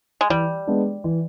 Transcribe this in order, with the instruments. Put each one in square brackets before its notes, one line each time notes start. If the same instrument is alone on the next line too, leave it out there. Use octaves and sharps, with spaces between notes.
[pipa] G#3
[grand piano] E3 [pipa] G3
[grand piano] G#3 B3 D4
E3